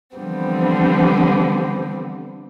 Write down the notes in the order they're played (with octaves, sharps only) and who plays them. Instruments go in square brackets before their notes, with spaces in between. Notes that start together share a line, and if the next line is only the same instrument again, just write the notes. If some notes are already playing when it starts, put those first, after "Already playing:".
[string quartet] D3 E3 F3 G3 B3 C4